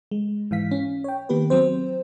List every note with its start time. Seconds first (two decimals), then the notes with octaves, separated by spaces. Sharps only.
0.11 G#3
0.51 G#2 E3 F5 B6
0.71 C#4
1.04 C#5 G5
1.29 D#3 A#3 B3 G4 B4
1.50 F#3 C4 C5